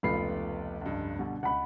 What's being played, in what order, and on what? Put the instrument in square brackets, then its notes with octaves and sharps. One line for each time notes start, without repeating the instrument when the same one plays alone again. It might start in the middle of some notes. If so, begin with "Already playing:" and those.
[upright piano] F1 B5 C7 [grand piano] C#2 B3 F4
[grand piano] C#2 G2
B2 D3 G3
[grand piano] C#2 [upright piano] F#5 B5